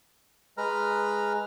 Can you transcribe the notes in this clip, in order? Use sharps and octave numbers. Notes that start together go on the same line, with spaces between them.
G#3 B4 A#5 F6